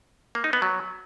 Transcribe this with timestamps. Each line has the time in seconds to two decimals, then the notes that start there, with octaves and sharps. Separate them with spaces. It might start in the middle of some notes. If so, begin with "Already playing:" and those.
0.35 A#3
0.44 D#4
0.53 B3
0.62 F#3